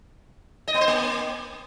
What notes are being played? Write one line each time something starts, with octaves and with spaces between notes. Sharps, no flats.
D#5
B3
C5
A#3